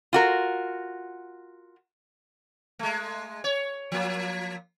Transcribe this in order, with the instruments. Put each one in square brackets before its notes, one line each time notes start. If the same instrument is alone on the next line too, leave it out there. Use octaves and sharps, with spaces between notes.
[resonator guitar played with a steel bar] F4 F#4 A#4
[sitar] G#3 A3
C#5
F3 A#3